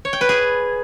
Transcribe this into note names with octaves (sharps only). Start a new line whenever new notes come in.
C#5
G5
B4
G#4